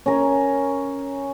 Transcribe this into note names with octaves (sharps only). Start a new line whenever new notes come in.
C#4 A#4